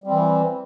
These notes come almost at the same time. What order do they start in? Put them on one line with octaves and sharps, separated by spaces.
G3 C4 E3